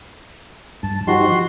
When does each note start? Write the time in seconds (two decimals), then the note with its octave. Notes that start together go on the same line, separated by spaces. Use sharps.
0.83 G2 A5
1.07 F3 D#4 F#4 G4 C6